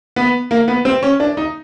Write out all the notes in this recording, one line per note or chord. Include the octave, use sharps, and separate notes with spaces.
B3
A#3
B3
C4
C#4
D4
D#4